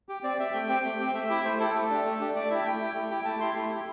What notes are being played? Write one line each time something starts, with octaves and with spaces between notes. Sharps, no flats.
G4
C4 D5
G4 E5
A3 G5
C4 G4
A3
C4 G4
A3 E5
E4 G4
A3 C5
E4 G4 A4
A3 A4
D4 G4
A3
D4 G4
A3 D5
E4 G4 E5
A3 G5
E4 G4
A3
E4 G4
A3 A5
E4 G4 C6
A3
E4 G4